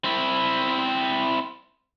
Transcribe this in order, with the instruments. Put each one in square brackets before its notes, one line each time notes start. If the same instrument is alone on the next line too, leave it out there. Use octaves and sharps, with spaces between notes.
[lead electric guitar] C4 E4